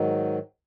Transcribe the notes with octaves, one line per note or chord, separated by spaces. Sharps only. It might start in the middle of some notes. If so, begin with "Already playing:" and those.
Already playing: G#2 D#3 F#3